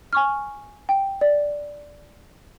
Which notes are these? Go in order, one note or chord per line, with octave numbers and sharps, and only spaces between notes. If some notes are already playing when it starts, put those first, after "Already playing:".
G#5 C#6 F6
G5
D5